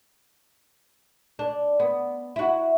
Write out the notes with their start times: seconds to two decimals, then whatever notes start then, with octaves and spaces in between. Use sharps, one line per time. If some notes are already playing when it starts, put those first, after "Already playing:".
1.39 D4
1.80 B3
2.36 E4 F#4